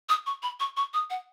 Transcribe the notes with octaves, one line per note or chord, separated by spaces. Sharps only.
D#6
C#6
B5
C#6
C#6
D#6
F#5